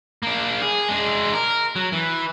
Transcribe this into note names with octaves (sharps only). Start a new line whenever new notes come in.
A#3 D4
G#4
G#3 D4
A#4
F#3
E3